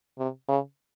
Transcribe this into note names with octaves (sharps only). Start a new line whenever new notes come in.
C3
C#3